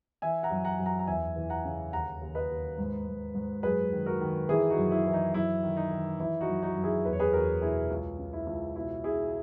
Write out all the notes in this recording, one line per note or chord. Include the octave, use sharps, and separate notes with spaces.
E3 E5 G#5
F#5 A#5
F#2
F#5 A#5
F#2
F#5 A#5
A#5
E2 E5 G#5
E3
F#5 A#5
C#3
D#2 F#5 A#5
D#2
B4 D#5
D#2
G#2
G#2
G#2
F#2 G#4 B4
D#3
F#4 A#4
D#3
E3 E4 G#4
D#4 F#4
F#2
E4
E3
D#4
F#2 E4
D#3
D#4
D#3
E3 E4
D#4 F#4
F#2
D#4 F#4
F#2
E4 G#4
E2 B4
C#5
G#4 B4
E2 F#4 A#4
B2 E4 G#4
C#2
C#3
E4
C#2
B2 E4
B2 E4 G#4